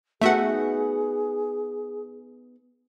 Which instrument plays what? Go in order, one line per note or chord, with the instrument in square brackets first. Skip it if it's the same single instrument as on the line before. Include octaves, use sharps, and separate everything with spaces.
[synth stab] A3 E5 F#5 [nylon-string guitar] B3 D#4 F#4 [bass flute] G#4